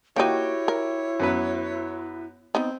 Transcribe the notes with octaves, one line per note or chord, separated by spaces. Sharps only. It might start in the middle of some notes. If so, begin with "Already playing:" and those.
A#3 D#4 E4 F#4 G4 C#5 G5
A#4
F#2 B3 B4
B3 C4 D#4